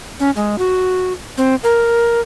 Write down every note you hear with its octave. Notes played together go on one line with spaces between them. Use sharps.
C#4
G#3
F#4
C4
A#4